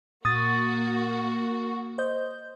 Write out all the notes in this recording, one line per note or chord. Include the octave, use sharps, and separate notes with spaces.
A#2 A#3 F#4 D#6 A6
C5 D#5 G6